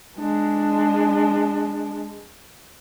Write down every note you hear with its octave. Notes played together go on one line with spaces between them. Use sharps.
G#3 D4